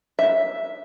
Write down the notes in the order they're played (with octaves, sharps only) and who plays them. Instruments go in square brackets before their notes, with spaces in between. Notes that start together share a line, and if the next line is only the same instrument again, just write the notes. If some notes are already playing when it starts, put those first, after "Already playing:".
[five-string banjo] E5